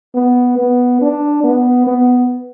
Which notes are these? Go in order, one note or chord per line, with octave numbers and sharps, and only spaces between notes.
B3
B3
D4
B3
B3